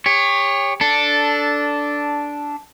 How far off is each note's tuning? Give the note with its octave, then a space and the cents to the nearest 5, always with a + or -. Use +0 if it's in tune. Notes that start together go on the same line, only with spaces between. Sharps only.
G4 +35 C#5 +0
D4 -10 A4 +0